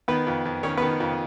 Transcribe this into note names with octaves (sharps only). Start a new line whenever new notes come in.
D#3 B3 B4
F2
F2
D#3 C#4 C#5
B3 B4
D#3
F2